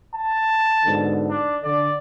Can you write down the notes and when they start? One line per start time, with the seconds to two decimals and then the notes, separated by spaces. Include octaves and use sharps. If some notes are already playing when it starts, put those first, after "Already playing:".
0.15 A5
0.84 G#2 B2 D3
1.30 D4
1.63 D3 D5